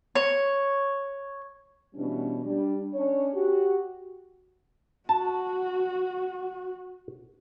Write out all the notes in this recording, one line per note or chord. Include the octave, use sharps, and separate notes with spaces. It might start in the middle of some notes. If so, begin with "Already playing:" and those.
C#5
B2 E3 G3 C#4 D4
G3 D4
C#4 D4 C#5
F#4 G4
F#4 A5